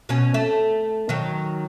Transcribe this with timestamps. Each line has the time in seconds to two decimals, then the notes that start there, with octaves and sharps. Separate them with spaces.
0.09 B2 C#4
0.34 A3
1.09 D#3 F#3